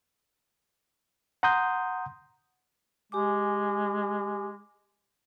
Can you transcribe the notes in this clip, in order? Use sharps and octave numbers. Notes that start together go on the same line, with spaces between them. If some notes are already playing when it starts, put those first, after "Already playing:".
F#5 A#5 C6 D#6 G6
G#3 G4 G#5 D6